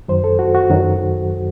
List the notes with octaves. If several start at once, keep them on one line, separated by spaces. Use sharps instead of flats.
F#2 D#3 F#3 C5
A4
F#4
F#4
F#2 D#3 F#3